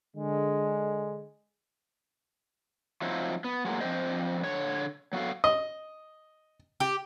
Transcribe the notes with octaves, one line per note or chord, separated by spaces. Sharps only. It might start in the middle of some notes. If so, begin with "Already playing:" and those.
D3 G#3
F3 F#3 C4 D#4 E4
B3
F#3 G#3 A#3
F3 C4 D4 E4 C5 D#5
D3 C#5
F#3 B3 F#4 A4 F5
D#5
G4